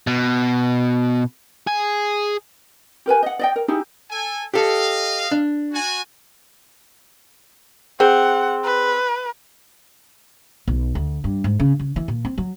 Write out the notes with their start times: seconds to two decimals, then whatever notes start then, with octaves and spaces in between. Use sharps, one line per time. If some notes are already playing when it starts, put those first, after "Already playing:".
0.07 B2
1.67 G#4
3.06 G4 A#4 B4 G#5
3.23 D#5 F#5
3.39 D5 D#5 G5
3.56 A#4
3.68 D#4 E4 G4 G#4
4.10 A4 G#5
4.54 G4 A4 D#5 F5
5.31 D4
5.72 F#4 G#5
8.00 C4 G#4 F#5
8.64 B4
10.68 B1
10.95 D2
11.24 G2
11.44 G#2
11.60 C#3
11.80 C#3
11.96 E3
12.08 A#2
12.25 C4
12.38 F#3